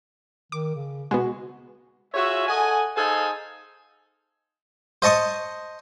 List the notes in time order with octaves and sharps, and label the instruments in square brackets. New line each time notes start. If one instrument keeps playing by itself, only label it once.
[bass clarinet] D#3 [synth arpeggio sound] D6
[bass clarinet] C#3
[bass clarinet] B2 [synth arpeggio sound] G#3 B3 [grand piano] F#4
[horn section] F4 F#4 G#4 C#5 E5
A4 D#5 F#5 G#5
D#4 G#4 A4 C5 F5 G#5
[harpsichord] C5 D#5 A5 C#6 D#6